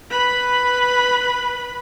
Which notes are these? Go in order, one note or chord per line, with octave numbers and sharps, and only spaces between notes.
B4 B5